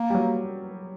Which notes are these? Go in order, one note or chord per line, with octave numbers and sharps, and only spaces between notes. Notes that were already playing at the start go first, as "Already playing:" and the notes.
Already playing: A#3
G3
F#3